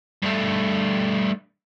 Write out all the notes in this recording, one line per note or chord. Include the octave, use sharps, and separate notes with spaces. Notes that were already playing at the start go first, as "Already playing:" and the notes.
G2 A3